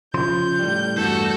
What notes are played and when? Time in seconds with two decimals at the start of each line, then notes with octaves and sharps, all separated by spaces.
0.14 C#3 F3 C6 G6
0.59 A2 G3
0.97 E2 G2 A3 F#4 A4